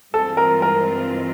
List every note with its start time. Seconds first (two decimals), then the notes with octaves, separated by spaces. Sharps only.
0.13 G2 E3 G#3 C4 F4 A4
0.37 A#4
0.62 A#4